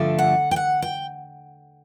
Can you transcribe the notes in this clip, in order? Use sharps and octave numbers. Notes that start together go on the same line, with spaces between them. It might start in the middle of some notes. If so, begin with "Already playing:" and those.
Already playing: G2 D3 F3 A3 D4
F#5
G5
F#5
G5